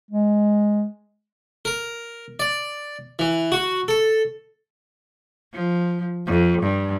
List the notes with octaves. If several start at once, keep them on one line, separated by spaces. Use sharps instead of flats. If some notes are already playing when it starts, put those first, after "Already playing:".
G#3
A#4
D5
E3
F#4
A4
F3
F2
G2